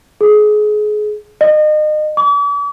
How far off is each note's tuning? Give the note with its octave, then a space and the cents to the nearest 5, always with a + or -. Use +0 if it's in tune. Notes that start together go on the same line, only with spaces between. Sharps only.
G#4 +25
D#5 -30
D6 -45